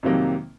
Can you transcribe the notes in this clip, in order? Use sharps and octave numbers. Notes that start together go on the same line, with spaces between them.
F2 C3 D#3 F#3 A#3